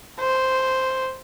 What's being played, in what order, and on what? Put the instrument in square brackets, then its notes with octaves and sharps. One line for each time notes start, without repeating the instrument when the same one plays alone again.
[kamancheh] C5